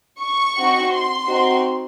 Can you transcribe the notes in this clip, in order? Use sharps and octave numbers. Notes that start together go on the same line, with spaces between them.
C#6
C4 D#4 F#4
C6
C4 D#4 F#4